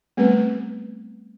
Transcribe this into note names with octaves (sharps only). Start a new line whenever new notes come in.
G3 A3 B3 C4 B4